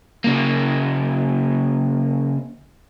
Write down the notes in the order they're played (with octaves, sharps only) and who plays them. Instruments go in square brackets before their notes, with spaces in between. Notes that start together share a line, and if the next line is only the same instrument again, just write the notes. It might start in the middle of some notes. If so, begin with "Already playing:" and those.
[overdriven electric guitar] C#3 A#3